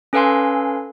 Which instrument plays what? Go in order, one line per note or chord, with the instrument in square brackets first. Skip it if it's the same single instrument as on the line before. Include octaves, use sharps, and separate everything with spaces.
[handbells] C#4 A4 B4 F5 G#5 C6